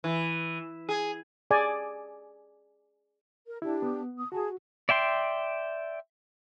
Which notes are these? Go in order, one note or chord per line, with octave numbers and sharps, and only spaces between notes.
E3
G#4
G#4 D5 G#5
A#4
D4 E4 G4
B3
D#6
F#4 G#4 A5
D5 E5 G5 C6